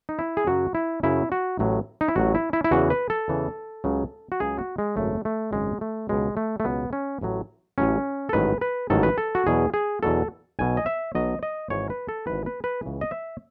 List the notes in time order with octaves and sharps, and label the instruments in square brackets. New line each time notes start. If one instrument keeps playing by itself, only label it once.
[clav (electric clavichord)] D#4
E4
G#4
F#2 C#3 F#3 F#4
E4
F#2 C#3 F#3 E4
F#4
A1 A2 F#3
D#4
E4
A1 A2 F#3 F#4
E4
E4
E4
E2 C#3 E3 F#4
B4
A4
E2 C#3 E3
C#2 C#3 F#3
F#4
C#2 C#3 F#3 G#4
F#4
G#3
G#1 F#2 C#3 F#3 A3
A3
G#1 F#2 C#3 F#3 G#3
A3
C#2 B2 F#3 G#3
A3
A3
C#2 B2 F#3 B3
C#4
A1 A2 F#3
A1 A2 F#3 C#4
A4
A1 G#2 D#3 F#3 B4
B4
A1 G#2 D#3 F#3 A4
B4
A4
F#4
E2 B2 F#3 G#4
G#4
E2 B2 F#3 A4
B1 B2 F#3 G#5
D#5
E5
B1 B2 F#3 D#5
D#5
G#1 G#2 E3 C#5
B4
A4
G#1 G#2 E3 B4
B4
B4
C#2 C#3 E3
D#5
E5